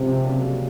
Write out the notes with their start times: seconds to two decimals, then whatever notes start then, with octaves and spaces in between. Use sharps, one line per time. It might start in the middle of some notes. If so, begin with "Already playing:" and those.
Already playing: G#2 C3 F3 G#3 C#4
0.24 C#3 F#3 A#3 D4